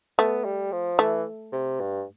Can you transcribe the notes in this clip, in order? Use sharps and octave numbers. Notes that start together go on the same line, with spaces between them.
A3 B3
G3
F3
E3 A3
C3
G2